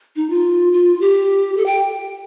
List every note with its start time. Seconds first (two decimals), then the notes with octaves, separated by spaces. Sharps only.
0.16 D#4
0.30 F4
0.72 F4
1.01 G4
1.57 A4
1.66 G5